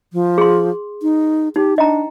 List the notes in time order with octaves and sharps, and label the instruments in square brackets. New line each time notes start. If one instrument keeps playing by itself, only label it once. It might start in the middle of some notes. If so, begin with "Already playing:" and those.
[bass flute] F3
[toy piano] G#4 C6
[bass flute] D#4
[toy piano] D#4 [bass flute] G4
[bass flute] D4 [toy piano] D#5 G5 A#5